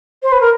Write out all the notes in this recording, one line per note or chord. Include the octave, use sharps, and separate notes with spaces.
C5
B4
A#4